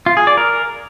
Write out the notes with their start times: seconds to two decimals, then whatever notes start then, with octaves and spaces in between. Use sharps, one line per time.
0.06 F4
0.17 G#4
0.27 D5
0.37 A#4